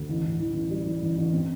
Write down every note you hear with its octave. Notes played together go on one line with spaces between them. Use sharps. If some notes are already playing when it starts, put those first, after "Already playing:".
Already playing: D2
A1
A1
E3
A1
G3
E3
A1
A1
C4